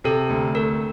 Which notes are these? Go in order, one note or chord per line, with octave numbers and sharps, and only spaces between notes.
C3 A4
D2
A3 A#4